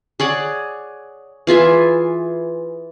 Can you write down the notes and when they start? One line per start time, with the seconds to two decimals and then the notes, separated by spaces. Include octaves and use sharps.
0.20 G#4 C#5 D5 F#5
1.47 E3 F4 G#4 E5